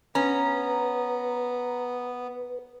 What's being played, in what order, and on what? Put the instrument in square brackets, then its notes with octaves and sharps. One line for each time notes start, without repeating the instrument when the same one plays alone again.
[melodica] B3 [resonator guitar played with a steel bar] C#4 [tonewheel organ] B4 [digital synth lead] A#5